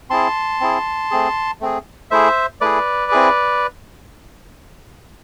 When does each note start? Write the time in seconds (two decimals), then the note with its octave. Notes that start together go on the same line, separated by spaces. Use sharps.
0.10 C4 E4 G#4 A5 C6
0.60 C4 E4 G#4
1.11 A3 C4 G#4
1.61 A3 C4 G#4
2.11 A3 E4 G#4 C5 E5
2.61 A3 E4 G#4 B4 D5
3.12 C4 E4 G#4